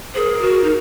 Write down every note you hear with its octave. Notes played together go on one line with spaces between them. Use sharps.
G#4 A#4 C5
F#4
D#4